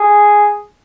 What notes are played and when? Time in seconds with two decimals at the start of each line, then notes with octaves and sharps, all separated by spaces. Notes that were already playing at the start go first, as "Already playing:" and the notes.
Already playing: G#4